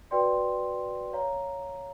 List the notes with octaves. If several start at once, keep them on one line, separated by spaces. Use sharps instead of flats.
F#4 B4 D5 G5 C6
C#5 F5 A#5